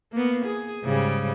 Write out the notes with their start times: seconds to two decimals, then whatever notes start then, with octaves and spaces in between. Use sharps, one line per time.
0.12 A#3 B3
0.46 G#4
0.84 G#2 C#3 G3